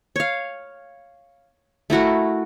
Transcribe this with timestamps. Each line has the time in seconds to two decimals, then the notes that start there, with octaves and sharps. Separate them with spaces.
0.16 C#5 F5
1.90 A3 E4 F#4 A#4